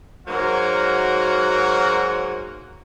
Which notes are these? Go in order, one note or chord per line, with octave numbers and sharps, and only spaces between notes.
G#2 F#3 A#3 F#4 A#4